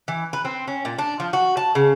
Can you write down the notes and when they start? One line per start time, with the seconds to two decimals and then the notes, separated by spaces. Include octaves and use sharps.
0.08 E3
0.33 B4
0.45 C4
0.68 C#4
0.85 A#2
0.98 D4
1.20 F3
1.33 F#4
1.57 A5
1.75 C#3